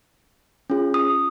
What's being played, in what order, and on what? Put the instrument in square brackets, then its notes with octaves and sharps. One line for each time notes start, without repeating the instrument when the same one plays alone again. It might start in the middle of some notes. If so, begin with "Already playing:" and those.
[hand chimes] C#4 F4 G#4
D#6